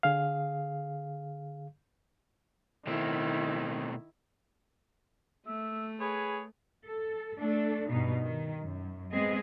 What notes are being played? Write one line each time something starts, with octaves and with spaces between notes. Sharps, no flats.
D3 G#4 F5
B2 D#3 A3 C4 E4
A3 E5
G#4 B4 C#5
A4
A3 D4 A4
G2 B2 D#4
D#3
F#2
G#3 B3 C4 G#4 D#5